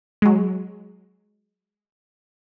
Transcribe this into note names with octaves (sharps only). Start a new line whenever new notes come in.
F#3 G#3